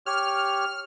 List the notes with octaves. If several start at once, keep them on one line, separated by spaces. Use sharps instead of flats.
G4 C#5 F6